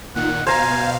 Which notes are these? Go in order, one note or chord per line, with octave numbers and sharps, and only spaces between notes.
A#2 D#3 F#5
B2 C5 F5 G#5 A#5